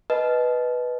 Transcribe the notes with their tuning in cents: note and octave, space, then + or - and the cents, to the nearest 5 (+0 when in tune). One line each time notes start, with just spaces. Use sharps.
B4 +0 D#5 +0 A5 -35